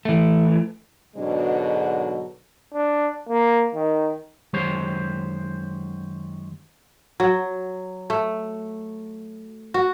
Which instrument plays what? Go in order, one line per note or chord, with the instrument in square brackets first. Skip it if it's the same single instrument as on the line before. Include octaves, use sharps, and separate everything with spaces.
[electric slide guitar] E3 A3
[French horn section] G#2 B2 D3 F#3 G#3 D4
[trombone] D4
A#3
D#3
[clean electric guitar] F#2 D#3 G#3 G4 C5 C#5
[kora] F#3
A3
F#4